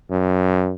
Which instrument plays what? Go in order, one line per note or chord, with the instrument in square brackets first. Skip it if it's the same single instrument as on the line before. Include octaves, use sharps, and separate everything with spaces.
[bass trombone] F#2